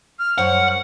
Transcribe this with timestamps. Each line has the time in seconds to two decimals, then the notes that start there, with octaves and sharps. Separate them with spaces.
0.19 F6
0.38 F#2 C5 C#5 F#5